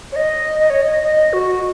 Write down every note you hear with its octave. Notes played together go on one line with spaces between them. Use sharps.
C#5
D#5
D#5
C#5
D#5
D#5
F#4